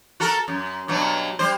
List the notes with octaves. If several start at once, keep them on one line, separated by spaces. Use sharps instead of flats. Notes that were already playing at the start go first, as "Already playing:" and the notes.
F#4 A4 A#4
F#2
G2 B2 F#3
G3 C5